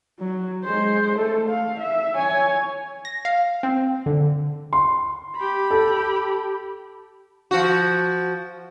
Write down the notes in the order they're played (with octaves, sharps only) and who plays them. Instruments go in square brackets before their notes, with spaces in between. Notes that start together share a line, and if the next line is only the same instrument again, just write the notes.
[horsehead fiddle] F#3
G#3 C5
A3 A4
F5
E5
C#5 G#5
[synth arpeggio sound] A#6
F5
C4
D3
[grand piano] C6
[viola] G4 B5
[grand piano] A4
[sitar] F3 F#4